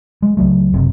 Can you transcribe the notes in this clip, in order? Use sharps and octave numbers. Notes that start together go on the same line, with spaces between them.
G#3
C#2 F#3 A3
F#1 C3